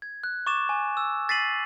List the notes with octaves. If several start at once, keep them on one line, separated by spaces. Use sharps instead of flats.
G#6
F#6
C#6 D6 A6 E7
G#5
E6
A6 B6 C7 D#7 F#7